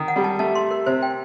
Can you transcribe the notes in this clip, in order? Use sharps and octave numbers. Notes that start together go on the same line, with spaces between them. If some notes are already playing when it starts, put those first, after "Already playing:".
Already playing: D#3
F#5
G3
A5
A3 A5
C6
A#4
C3 C5
G5